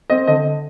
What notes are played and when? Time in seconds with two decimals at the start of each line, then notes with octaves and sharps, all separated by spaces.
0.10 C4 D#5
0.27 D3 D#5